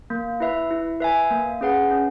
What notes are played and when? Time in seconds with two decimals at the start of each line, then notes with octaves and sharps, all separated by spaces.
0.10 A#3
0.40 E4 B4 E5
0.71 E4
1.00 B4 E5 G#5
1.31 A#3
1.61 C#4 G#4 B4 F#5
1.91 C#4